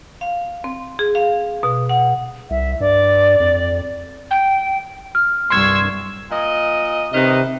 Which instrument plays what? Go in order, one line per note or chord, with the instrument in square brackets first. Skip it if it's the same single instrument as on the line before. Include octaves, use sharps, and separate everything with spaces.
[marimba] F5
C4
G#4
F5
B2
F#5
[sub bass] C2 [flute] E5
[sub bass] G2 [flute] D5
[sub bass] F2
[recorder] G5
[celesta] F6
[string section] C2 G2 [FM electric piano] C6 G#6 [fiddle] C#6 E6
[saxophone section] A#2 D#5
[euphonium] C3 [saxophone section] D#3 B4 D#5